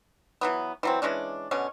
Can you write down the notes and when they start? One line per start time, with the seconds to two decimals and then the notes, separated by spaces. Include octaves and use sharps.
0.41 E3 F#3 B3
0.83 E3 F#3 C4
1.02 E3 G#3 C#4 D4
1.51 B2 D3 C#4